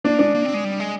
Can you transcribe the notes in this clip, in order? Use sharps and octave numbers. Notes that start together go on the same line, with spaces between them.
A#3 D4
G#3 D4
A#3
C4
G#3
G3
G#3